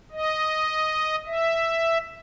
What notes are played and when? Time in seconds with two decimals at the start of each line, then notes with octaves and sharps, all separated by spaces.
0.12 D#5
1.27 E5